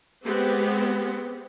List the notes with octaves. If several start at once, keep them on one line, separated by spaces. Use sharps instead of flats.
G#3 B3 C4 G4